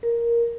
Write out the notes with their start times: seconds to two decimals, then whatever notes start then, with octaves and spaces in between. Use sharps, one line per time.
0.03 A#4